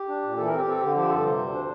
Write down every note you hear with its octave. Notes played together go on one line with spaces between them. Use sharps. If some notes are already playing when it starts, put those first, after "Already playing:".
Already playing: G4
D4
A#2
E3 A4
C4 A#4
G4
C4 A4
D3 G4
F3 G4
G2 A4
C3 C5
D2
D4